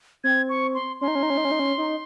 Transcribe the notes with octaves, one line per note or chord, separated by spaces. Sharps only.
C4 G#6
C#6
C6
C#4 C6
D#4
C#4
D#4
C#4
D#4
C#4
D#4
C#4
D#4